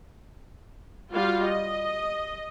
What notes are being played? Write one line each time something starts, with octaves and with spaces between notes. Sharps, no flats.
G3 F4 F#4 F5
D#5